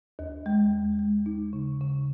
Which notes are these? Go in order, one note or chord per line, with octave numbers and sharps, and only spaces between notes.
D#2
G#3
D#2
G#3
D#4
C#3
C#3